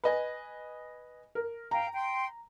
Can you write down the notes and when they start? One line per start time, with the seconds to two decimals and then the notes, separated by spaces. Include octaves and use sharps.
0.04 B4 D#5 G#5
1.35 A#4
1.71 F5 G5 A#5
1.93 G5 C6